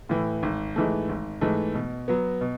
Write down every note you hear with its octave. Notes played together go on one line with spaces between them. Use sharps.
A2 E3
G#1
G#2 E3 A3
G#1
G#2 E3 A3
B2
F#3 B3
B2